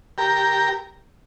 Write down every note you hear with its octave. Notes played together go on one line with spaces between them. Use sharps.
G4 A#4